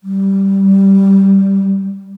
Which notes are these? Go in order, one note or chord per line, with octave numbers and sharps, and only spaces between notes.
G3